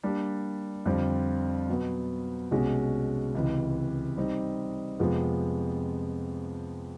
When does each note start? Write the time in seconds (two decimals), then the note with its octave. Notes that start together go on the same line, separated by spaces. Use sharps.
0.03 G3 A#3 D4 G4
0.86 F2 D3 G3 C4 F4
1.69 B2 F#3 B3
2.51 C2 B2 G#3 C#4 F#4
3.35 C#2 C3 E3
4.17 G3 C4 D#4
4.99 F2 C3 F3 G#3 B3